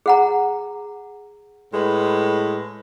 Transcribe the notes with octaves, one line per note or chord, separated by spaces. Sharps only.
G#4 F#5 A#5
A2 G#3 B4